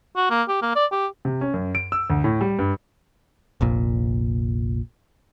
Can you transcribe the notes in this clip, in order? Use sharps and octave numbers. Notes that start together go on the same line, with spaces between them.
F#4
A#3
G4
A#3
D5
G4
C3
C#4
F#2
D7
E6
D2
A2
G3
G2
F1 A#1 A#2